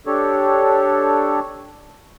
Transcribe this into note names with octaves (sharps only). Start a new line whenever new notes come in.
D4 G4 A4 C#5